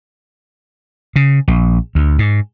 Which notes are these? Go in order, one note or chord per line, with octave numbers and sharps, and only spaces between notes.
C#3
A#1
D2
G#2